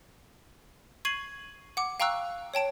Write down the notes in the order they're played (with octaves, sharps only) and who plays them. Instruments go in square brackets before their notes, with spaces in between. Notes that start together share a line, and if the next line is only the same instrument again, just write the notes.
[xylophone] C#6 G#6 C7 D#7 F#7
F#5 D6
F5 G5 A#5 C#6 E6 F#6
C#5 G5 A5 D7